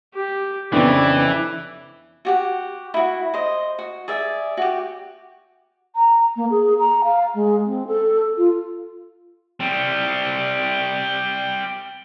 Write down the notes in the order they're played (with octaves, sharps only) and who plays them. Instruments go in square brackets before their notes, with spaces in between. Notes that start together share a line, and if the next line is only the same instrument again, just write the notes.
[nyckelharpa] G4
[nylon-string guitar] F2 C#3 [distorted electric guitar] E3 [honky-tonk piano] B3 D4 [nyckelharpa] D5
[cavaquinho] F#4 G4 F#5
E4 F#4
C5 D#5
F#4
G#4 D5 E5
F#4 G4
[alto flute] A#5
A#3
G#4
A#5
F5
G#3
C4
A4
F4
[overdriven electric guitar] G3 C4